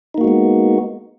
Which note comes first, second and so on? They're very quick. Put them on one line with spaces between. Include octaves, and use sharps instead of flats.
D#4 A#3 F#4 G#3 B3